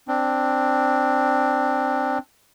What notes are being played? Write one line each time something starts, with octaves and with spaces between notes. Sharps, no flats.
C4 D4